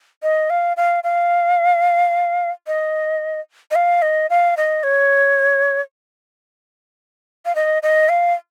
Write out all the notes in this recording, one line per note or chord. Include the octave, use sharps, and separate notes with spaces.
D#5
F5
F5
F5
D#5
D#5
F5
D#5
F5
D#5
C#5
F5
D#5
D#5
F5